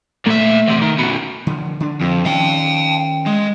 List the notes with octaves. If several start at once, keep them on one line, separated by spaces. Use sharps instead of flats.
A#2 A3 E5
E2 C3
D#3
F#2 B2
D3 D#3 F3
D3 D4
F2
D#3 C#4 F5 G5
G#3